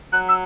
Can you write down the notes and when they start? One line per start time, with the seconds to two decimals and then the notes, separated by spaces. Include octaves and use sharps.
0.13 F#3 F#6
0.29 E6